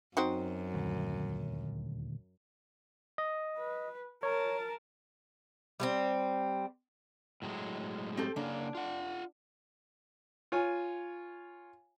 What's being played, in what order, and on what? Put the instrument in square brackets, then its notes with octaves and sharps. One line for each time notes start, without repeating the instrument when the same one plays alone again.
[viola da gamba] F#2 [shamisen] C4 D#4 F#4
[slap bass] D#1 D2
[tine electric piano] D#5
[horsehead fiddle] B4
[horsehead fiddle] A#4 A5 [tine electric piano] C#5
[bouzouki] G3 B3 C4
[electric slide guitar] A2 F#3 G#3
[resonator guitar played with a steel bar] C4 G4 A4
[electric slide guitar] C#3 A#3 [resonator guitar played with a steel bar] D4
[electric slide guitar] F4 F#5
[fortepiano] F4 C#5 G#5